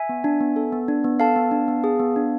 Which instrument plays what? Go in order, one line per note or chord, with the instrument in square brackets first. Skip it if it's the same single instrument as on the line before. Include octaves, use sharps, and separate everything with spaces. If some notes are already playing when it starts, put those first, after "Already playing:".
Already playing: [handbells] E5 G#5
B3
D4
B3
A4
B3
D4
B3
A4 F5 A5
B3
D4
B3
G#4
B3
D4